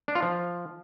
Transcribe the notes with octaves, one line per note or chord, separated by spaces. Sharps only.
D4
F4
F3